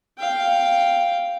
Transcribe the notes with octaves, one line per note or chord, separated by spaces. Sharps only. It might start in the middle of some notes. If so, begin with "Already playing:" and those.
F5 G5